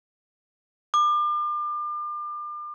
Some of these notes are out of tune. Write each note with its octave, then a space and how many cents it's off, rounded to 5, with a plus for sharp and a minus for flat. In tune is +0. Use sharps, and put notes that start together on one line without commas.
D6 +35